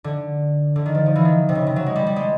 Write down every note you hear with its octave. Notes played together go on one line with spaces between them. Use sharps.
D3
D3
D#3
F3
F3
E3
D#3
C3
C#3
C3
F#3
G#3
G3
G3
G#3